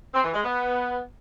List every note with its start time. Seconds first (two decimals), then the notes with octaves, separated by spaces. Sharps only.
0.14 C4
0.24 E3
0.33 G#3
0.43 B3